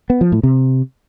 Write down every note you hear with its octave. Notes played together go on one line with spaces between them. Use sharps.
B3
F3
A2
C3